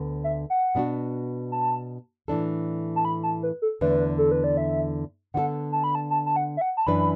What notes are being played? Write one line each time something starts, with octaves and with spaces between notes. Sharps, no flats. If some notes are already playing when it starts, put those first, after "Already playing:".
Already playing: D2 D3 B3 B4
E5
F#5
B2 B3 D4 F#4
A5
A2 E3 D4 A4
A5
B5
A5
B4
A4
E2 D3 A3 B4
A4
B4
D5
E5
D3 B3 D4 F#4 A4 F#5
A5
B5
A5
A5
A5
F#5
E5
F#5
A5
F#2 E3 D4 B4 B5